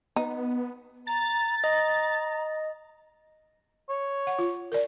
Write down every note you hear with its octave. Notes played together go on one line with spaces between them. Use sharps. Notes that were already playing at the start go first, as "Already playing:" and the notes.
B3 D#4
A#5 A6
D#5 A#5
C#5
F#5
F4
A#4 D5